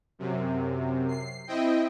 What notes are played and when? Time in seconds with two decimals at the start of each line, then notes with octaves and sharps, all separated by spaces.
0.19 F#2 C3
1.09 C7
1.47 C4 E4 D#5 G5